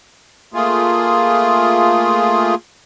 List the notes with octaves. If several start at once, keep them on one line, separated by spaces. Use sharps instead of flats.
A3 A#3 F4 G#4